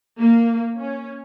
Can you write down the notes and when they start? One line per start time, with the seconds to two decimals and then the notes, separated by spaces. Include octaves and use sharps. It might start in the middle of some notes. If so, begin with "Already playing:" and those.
0.20 A#3
0.77 C#4